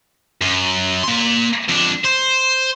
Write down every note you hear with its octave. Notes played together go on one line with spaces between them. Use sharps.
F#2
A#3 C6
F2 D4
C5